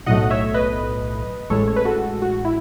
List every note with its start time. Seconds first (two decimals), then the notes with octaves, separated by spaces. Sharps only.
0.06 B1 A2 F#3 A3 D#5 F#5
0.30 C#5 E5
0.54 B4 D#5
1.50 A1 A2 G#3 A4 C#5
1.68 C#5
1.76 B4
1.85 F#4 A4
2.22 F#4
2.45 E4